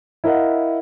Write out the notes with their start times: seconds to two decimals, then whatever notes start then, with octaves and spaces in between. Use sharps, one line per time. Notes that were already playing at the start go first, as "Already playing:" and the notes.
0.24 E4 A#4 D#5 F5 F#5